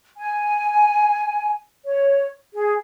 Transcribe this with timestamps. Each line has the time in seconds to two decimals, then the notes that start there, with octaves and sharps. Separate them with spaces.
0.17 G#5
1.84 C#5
2.54 G#4